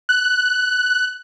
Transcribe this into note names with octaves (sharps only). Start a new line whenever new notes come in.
F#6